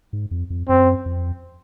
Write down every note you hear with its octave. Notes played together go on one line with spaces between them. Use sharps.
G#2
F2
F2
F#2 C4
F2